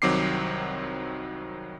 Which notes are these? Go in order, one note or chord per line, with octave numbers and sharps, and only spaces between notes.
C2 D#3 F#3 C4 D6 C7